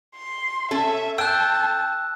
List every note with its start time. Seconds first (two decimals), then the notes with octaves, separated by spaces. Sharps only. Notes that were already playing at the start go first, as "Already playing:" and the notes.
0.16 C6
0.71 C#4 A4 E5
1.18 G5 A5 E6 F#6